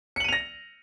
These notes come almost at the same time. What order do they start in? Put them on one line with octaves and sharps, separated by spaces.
C#7 F#7 D#7 F7 A#6